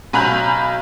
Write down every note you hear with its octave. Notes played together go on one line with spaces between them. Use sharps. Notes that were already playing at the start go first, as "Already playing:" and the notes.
B1 G#5 A#5 B5 F#6 G6